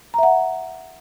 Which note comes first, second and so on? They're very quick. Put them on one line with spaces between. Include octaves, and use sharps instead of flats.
A#5 E5 F#5